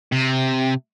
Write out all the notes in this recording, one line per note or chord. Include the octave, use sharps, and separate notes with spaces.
C3